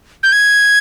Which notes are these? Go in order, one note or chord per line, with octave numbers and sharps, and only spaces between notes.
G6
G#6